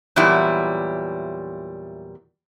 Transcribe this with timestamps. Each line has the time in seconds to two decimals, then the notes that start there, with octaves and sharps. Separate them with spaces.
0.16 E2 A#2 F#3 G3 E4